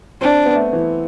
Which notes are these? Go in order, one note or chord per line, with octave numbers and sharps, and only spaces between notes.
C4 D4
B3
A3
E3